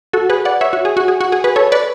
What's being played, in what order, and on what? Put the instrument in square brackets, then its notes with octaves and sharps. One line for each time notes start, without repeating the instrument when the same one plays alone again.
[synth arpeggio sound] F#4 A4
G#4 B4
D5 F#5
C#5 E5
F#4
G#4
F#4
G#4
F#4
G#4
G#4 B4
A4 C#5
B4 D5